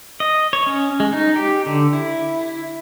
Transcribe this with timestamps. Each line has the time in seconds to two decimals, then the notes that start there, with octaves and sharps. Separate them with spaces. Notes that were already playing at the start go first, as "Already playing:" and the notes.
0.20 D#5
0.53 C#5
0.67 C#4
1.00 G#3
1.13 D#4
1.36 G4
1.66 D3
1.93 E4